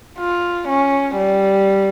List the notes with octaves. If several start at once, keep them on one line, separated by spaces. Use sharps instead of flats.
F4
C#4
G3